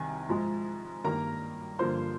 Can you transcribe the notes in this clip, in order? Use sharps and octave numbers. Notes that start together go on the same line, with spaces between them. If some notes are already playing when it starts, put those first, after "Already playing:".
Already playing: C2 C3 D#3 G#5
G#2 F3 G#3
G2 D#3 G3 A#3 A#4 A#5
G2 D3 F3 A#3 C5 C6